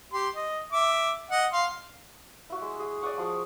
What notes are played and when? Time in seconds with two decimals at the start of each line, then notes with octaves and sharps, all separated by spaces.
0.13 G4 C6
0.36 D#5
0.73 E5 D6
1.31 D#5 F#5
1.53 F5 C6
2.50 E4 F#4
2.62 G#3
2.80 G#4
3.02 D5 D#5 F#5 C#6
3.18 F3 F#4 G#4